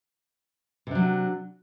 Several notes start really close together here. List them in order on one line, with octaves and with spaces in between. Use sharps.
C3 D4 F#3